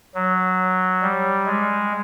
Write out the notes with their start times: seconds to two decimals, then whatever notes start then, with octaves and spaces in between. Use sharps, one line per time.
0.15 F#3
1.02 G3
1.46 G#3